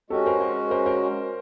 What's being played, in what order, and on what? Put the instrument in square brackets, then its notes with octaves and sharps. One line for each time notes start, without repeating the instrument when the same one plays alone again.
[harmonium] G#3 C#4 F#4 [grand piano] G4 A4
[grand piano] A#4 C5
A#4 C5
A#4 C5
A#4 C5